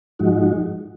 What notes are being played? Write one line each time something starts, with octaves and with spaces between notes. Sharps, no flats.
G#2 F3 G#3 D#4 F#4